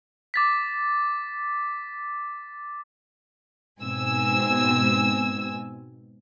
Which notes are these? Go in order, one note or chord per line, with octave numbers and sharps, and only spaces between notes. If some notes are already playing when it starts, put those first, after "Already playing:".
D6 A6 B6
G#2 B2 C4 G#5 E6